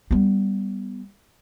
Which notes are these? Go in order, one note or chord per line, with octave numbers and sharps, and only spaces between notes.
G3 B3